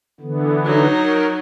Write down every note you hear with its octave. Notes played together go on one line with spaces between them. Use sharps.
D3 E3 B3
F#3 D#4
A#4